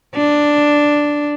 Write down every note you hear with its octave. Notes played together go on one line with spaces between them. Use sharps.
D4